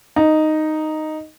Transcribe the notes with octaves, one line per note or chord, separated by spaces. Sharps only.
D#4